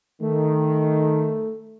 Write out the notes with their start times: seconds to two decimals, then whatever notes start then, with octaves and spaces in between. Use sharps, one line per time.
0.22 D#3 A3